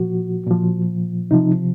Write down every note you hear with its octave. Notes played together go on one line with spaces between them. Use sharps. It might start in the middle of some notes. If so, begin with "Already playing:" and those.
Already playing: A#2 F3 F#4
A#2 F3
C3 F3 D#4